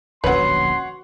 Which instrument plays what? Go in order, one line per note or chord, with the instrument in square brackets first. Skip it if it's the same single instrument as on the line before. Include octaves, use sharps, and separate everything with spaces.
[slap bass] D1 A#1 C#4 [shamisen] F#3 B4 [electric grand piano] C#5 F#5 [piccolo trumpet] C6